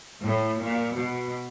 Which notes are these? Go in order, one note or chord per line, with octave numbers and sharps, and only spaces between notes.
A2
A#2
B2